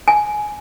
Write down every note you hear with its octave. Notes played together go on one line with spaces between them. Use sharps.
G#5